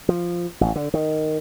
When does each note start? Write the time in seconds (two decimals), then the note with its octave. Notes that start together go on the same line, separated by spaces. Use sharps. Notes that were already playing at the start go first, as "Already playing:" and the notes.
0.09 F3
0.61 A1
0.76 D3
0.94 D#3